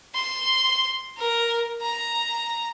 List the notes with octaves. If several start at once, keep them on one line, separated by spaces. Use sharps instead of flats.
C6
A#4
A#5